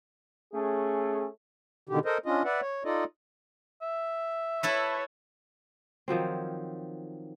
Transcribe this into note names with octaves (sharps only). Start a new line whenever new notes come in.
A3 C#4 G#4
B2 D3 D#3 G4
A4 A#4 C5 D#5
C#4 D4 F4 D#5
B4 D5 E5 F#5
C#5
D#4 F4 A4 D5 D#5
E5
E4 A4 B4 C#5 A5
D#3 F3 F#3 C4